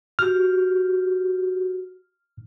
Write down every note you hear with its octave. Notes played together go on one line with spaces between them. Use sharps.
F#4 G4 F6